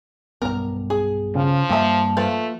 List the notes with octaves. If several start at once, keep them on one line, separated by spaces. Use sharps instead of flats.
B1 G2 B3 A#4 A#5
G#4
C#3 F3
G2 A#3 G4 E5 A5
F3 A3 F4 B4